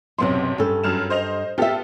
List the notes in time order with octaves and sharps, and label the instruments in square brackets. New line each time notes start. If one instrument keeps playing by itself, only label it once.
[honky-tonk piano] B1 B3 C6 [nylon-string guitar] F#2 A2 C3
[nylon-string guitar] G2 A4 [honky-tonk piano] C#4
[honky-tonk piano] F#2 F6 E7
C5 D#5 F7
[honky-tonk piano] B3 F4 A4 [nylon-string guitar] G4 E5